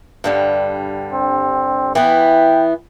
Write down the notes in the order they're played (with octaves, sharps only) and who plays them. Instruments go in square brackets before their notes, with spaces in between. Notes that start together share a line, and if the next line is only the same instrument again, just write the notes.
[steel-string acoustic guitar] G2 D3 G3
[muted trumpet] C4
[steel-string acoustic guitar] E3 B3 [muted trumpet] G5